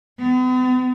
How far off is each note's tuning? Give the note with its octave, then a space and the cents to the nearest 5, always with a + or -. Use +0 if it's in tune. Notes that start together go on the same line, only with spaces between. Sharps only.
B3 +45